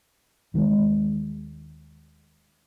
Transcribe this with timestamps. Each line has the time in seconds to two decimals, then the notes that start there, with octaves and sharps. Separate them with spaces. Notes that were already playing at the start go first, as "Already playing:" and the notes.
0.54 D#2 D#3 F#3 G#3